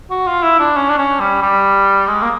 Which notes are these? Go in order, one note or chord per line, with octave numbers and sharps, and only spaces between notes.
F#4
F4
E4
D4
C#4
D4
C#4
G3
G3
G#3
A#3